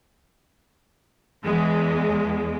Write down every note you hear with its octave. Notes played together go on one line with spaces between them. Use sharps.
E2 G#3